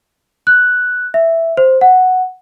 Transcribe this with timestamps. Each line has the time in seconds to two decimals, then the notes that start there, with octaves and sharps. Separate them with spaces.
0.47 F#6
1.14 E5
1.57 C5
1.81 F#5